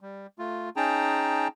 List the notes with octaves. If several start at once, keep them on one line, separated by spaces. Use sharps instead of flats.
G3
A3 F4
C#4 D#4 G#4 G5 A5 A#5